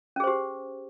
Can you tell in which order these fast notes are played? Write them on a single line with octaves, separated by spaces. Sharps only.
C#4 G#4 C5 G4